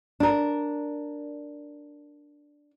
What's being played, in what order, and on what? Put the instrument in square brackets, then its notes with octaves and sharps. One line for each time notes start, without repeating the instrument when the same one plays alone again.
[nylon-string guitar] D4 A#4